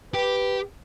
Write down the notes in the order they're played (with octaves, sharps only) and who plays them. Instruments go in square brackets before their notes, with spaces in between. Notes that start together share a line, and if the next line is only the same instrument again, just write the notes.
[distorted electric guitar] G4 [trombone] B4